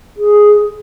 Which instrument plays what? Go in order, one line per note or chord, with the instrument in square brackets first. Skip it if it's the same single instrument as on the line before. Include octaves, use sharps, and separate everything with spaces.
[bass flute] G#4